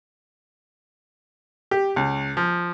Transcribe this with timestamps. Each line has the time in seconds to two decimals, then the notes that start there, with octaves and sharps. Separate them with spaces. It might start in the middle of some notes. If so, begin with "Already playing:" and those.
1.71 G4
1.96 C#2
2.37 F3